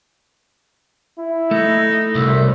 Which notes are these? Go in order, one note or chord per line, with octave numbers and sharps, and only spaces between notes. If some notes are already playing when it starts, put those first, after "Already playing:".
E4
A3 D#4
C2 F#2 E5